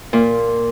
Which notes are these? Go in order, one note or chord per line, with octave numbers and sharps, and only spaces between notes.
A#2